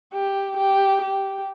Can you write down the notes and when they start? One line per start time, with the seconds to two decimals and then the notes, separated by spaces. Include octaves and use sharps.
0.13 G4
0.57 G4
1.01 G4